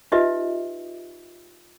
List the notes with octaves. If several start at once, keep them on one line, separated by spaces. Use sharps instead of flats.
D#4 F4 G4 B4 D#5 E5